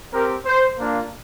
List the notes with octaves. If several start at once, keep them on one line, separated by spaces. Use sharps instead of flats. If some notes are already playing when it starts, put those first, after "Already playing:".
C4 G4 A#4
C5
A#3 D4 F4